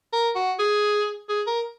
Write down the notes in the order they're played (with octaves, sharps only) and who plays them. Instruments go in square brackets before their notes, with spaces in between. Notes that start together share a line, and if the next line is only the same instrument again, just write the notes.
[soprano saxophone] A#4
F#4
G#4
G#4
A#4